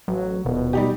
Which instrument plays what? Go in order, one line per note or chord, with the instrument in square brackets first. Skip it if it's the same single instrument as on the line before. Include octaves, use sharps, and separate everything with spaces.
[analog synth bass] A1 [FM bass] F#3
[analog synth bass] D#1 [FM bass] B2
[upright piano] G3 D#4 G4